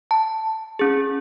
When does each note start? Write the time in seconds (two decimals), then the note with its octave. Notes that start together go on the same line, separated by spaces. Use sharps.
0.11 A5
0.79 C#4 G#4